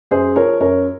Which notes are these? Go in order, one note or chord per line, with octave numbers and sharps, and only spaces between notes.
F#2 G#4 C5
F3 A#4 C#5
F#2 A#4 C#5